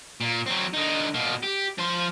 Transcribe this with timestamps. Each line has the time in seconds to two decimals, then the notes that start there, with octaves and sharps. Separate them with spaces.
0.20 A#2
0.46 F#3 C4
0.74 D3 D#4
1.14 B2 A#3
1.43 G4
1.78 F3 C6